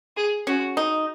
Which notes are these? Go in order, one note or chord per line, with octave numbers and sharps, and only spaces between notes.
G#4
C#4 F#4
D#4